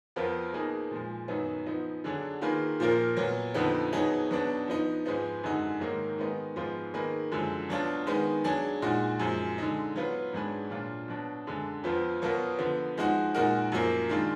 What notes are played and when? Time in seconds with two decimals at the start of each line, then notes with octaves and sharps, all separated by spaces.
0.16 F2 F3 B3 F4 A#4
0.53 B2 A#3 D#4 G#4
0.91 A#2 F3 G#3
1.28 F#2 D#3 F#3 B3 D#4
1.66 F3 B3 D#4
2.04 D3 F#3 D4 G#4
2.41 D#3 A#3 F4 G#4 B4
2.80 A#2 F3 A#3 F4 A#4
3.17 A#2 F#3 B3
3.54 F2 D3 F3 B3 D#4
3.92 B2 F#3 B3 D#4 G#4
4.30 B2 F#3 B3 D4
4.67 F3 B3 D#4
5.06 G#2 F3 G#3 B3 D#4
5.44 F#2 D3 G#3 D#4 F#4
5.81 G#2 D#3 F#3 A#3 D#4
6.18 D#3 G#3 B3 D#4
6.56 G#2 F3 G#3 B3 F4
6.94 D#3 A#3 D#4 G#4 B4
7.31 F#2 D3 F3 G#3
7.69 B2 F#3 D4 F4
8.07 D#3 G#3 B3 D#4
8.44 F#3 D4 G#4
8.82 A#2 G#3 D#4 F#4
9.20 F#2 F3 G#3
9.58 D3 G#3 D#4
9.96 F#3 B3 F4 B4
10.33 G#2 F#3 D4 G#4 B4
10.70 A#2 F#3 D4 F4
11.08 B2 F#3 D4
11.47 F#2 D3 G#3 D4
11.84 F2 F3 B3 F4
12.22 B2 F#3 B3 F4 A#4
12.59 D3 F3 B3
12.97 F3 G#3 D#4 F#4
13.34 A#2 G#3 D#4 F#4 A#4
13.72 F#2 F3 A#3
14.09 D#3 G#3 D4 F4